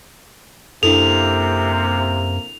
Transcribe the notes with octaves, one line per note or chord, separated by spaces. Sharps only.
F#2 C3 A#3 D4 E4 A4 F7